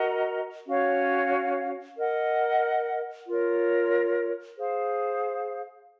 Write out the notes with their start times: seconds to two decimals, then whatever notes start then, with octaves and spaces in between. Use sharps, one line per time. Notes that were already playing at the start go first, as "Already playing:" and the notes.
Already playing: F#4 A#4 D#5 A#5
0.67 C#4 F#4 C#5 F5
1.97 A#4 D#5 F#5
3.27 F4 A#4 C#5
4.57 G#4 C5 F5